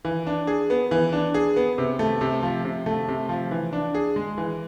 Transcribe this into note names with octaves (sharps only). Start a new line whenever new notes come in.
E3
D4
G#4
B3
E3
D4
G#4
B3
C3
A3
C3
F3
C3
A3
C3
F3
E3
D4
G#4
G#3
E3